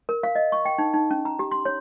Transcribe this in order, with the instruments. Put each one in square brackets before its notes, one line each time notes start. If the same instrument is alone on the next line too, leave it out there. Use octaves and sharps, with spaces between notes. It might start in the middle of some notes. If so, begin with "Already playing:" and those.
[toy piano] A#4
F5
D#5
C#6
G5
D#4
D#4
C#4
A#5
G4
C6
C#5